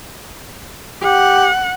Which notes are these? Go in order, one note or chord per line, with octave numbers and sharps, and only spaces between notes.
G4 F#5